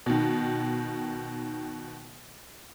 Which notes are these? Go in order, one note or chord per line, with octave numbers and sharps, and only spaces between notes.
B2 D#3